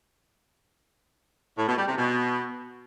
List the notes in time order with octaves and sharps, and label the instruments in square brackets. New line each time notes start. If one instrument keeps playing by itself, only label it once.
[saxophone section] A2
B2
G3
C3
B2